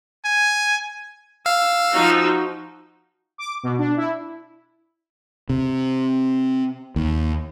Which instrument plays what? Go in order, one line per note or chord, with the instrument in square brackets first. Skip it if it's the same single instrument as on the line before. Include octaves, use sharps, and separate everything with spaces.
[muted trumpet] G#5
[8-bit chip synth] F5 [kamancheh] E6
[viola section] F3 D#4 F#4
[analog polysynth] D6
B2
D4
E4
[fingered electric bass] C3
D#2